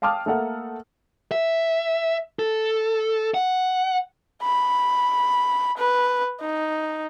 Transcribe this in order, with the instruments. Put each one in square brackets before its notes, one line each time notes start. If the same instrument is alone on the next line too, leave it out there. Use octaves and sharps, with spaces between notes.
[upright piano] F5 G5 A5 D6 D#6 F6
A3 A#3 A4 F#5
[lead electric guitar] E5
A4
F#5
[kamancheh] B5
B4
D#4